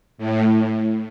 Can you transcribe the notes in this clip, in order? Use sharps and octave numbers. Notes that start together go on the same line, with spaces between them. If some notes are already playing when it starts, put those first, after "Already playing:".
A2